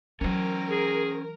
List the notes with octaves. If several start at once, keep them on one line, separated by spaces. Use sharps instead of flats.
E3 F#3 C#4 A#4 C5
G#4